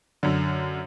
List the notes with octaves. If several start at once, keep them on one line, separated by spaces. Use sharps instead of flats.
F#2 D3